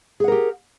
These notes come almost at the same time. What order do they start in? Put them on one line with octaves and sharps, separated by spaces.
G#4 F#5 A#4 G4